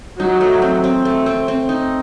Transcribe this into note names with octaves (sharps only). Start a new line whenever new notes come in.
F#3 D#4
A3
C4
C4
A3
C4
C4
D#4